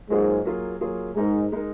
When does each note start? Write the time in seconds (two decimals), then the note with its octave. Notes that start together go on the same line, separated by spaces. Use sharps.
0.10 G#2 F#3 A#3 F4 G#4
0.45 F#3 A#3 F4 G#4
0.81 F#3 A#3 F4 G#4
1.16 G#2 G#3 D#4 A#4
1.52 G#3 D#4 A#4